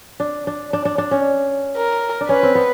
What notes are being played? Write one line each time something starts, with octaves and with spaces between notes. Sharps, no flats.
D4
D4
D4
D4
D4
C#4
A#4
D4
C#4 B4
C4
B3